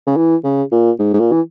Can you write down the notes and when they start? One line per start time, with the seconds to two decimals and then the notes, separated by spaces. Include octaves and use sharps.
0.07 C#3
0.17 E3
0.44 C#3
0.72 A#2
0.99 G#2
1.14 G#2
1.20 A#2
1.32 E3